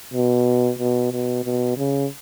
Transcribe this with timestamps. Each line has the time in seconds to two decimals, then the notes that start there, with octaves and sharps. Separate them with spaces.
0.14 B2
0.79 B2
1.12 B2
1.44 B2
1.77 C#3